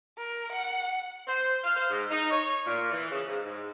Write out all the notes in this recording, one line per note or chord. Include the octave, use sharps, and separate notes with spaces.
A#4
F#5
C5
F5
C5
G#2
D#4
C#5
A#2
E3
C#3
G#2
G#2